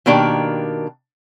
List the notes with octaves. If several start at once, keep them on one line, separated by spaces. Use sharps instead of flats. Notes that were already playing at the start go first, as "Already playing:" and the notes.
B2 D#3 A#3 D4 G4